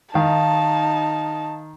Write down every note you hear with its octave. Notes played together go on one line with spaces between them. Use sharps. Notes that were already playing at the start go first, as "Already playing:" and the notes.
D#3 D#4 F5 A5